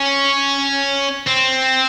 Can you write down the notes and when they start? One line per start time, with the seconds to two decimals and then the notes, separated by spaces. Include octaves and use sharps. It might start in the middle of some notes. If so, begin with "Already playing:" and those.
Already playing: C#4
1.27 C4